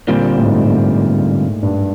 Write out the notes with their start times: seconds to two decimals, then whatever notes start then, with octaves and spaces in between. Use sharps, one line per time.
0.07 A#2 D3 G3 C4 F4
0.37 A2
0.46 G#2
0.55 A2
0.66 A#2
1.63 G2